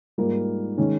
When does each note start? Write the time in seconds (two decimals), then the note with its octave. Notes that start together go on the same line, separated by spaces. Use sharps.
0.18 G#2 G3 A#3 F4 A#4
0.78 D#3 G#3 C#4